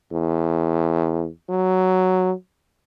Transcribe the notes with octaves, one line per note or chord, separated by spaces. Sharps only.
E2
F#3